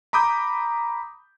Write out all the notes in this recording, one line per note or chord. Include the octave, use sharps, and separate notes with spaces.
A#5 B5 D6 D#6 G6